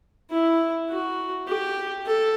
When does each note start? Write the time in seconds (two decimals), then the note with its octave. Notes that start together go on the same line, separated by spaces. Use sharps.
0.31 E4
0.90 F#4
1.48 G4
2.06 A4